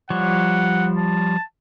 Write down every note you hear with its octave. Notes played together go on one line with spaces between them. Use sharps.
F3 G3 C#5 F#5
A5